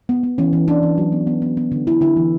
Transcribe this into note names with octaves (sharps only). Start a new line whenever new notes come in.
B3
B3
E3 C#4
E3
E3 D4
E3
F#3
B3
B3
B3
B3
D3
D3 E4
D3 E4
E3